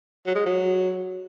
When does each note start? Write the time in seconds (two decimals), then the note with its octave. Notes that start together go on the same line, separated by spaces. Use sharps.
0.26 F#3
0.35 G#3
0.46 F#3